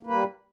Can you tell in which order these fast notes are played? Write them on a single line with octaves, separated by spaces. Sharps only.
A#3 B4 G3